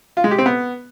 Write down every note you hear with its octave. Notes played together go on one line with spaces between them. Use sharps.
F4
G#3
G4
C4
B3